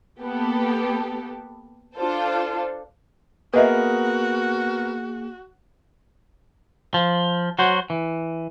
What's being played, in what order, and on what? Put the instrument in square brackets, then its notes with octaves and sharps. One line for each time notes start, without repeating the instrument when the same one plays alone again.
[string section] A#3 B3 G4 A4
D4 F4 A4 C5
[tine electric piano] A#3 G#4 [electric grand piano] B3 A#4 [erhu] F#4 [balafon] B4 D#5 E5
[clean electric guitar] F3
F#3 F#4 C5
E3